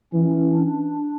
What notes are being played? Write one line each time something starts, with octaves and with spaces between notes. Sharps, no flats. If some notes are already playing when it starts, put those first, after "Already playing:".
E3 C#4
D4